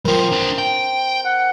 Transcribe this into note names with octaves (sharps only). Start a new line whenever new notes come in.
F#3 C4 F4 A#4
D4 C5
G5
F#5